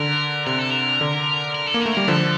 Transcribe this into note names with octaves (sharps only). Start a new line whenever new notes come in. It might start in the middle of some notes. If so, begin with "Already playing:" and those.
Already playing: D3 A#4
C3 A#4
A4
A#4
D3
A#4
A4
A#3
A#4
A3
G3 A#4
D3 F3 A4